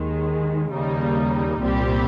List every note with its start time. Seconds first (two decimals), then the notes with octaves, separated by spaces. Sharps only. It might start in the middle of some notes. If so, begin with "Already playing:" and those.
Already playing: D#2 D#3 G#3
0.72 D#2 C#3 G3 A#3 D#4
1.60 C2 A#2 G3 C4 G4